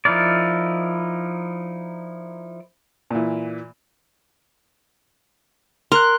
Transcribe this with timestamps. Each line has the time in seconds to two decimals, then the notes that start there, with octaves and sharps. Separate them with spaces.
0.05 F3 D#4 E4 A#4 D5
3.11 A#2 E3
5.92 A#4 C6 F#6